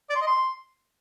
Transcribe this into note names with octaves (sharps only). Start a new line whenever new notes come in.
D5
C6
D#5
C6